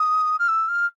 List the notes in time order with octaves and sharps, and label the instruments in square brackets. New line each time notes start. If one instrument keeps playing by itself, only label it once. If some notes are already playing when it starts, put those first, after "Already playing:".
Already playing: [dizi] D#6
F6
E6
F6